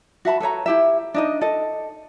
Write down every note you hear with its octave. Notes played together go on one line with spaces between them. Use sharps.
F#4 E5 A5 B5
A4 B4 C#5 A#5
E4 G4 E5
D4 D#4 D#5
A4 D#5